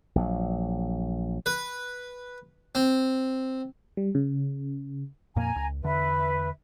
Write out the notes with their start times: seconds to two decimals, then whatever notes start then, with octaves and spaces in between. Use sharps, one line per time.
0.15 A#1 F#3
1.46 B4
2.75 C4
3.97 G3
4.15 C#3
5.36 F2 A#2 A#3 G#5 A#5
5.56 C#2
5.83 E2 D3 B4 E5